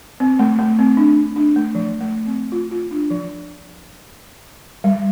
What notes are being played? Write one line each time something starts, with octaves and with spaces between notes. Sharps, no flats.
C4
A3
A3
C4
D4
D4
A3
F3
A3
C4
F4
F4
D4
F3
G3